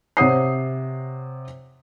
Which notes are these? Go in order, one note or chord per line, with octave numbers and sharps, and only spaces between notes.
C3 C#5 F#5 D#6 C7